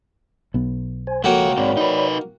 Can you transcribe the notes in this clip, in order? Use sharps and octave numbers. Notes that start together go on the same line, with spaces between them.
B1 B3
C5 G#5
C#2 F3 A#3 F#4 A4 C#5 G5
G#2 C4 C#5 D5 B5
D#4 B4